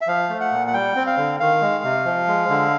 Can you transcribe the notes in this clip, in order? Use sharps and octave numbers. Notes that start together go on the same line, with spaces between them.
E5
F3 F5
A3
F#5
A#2
F#5
G3 G5
C4
F5
D3
D#3 F5
G#3
C3
F3
G#3
D3